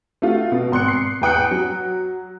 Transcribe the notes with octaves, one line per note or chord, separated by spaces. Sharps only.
A3 F4 F#4
B2
G#1 C6 F#6 C#7
C7
E2 B4 G5 D#6 F#6 C#7
F#3